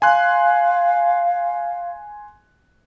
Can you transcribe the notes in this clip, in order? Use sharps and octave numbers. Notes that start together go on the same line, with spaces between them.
F5 G#5 C6 F#6